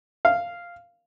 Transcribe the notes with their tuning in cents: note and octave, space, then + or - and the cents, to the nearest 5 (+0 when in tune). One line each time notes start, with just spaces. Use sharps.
F5 -5